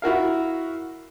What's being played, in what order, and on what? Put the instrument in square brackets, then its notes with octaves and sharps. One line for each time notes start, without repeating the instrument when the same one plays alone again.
[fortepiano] E4 F#4 A#4 F5